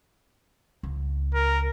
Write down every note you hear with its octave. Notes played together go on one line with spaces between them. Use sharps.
C#2
A#4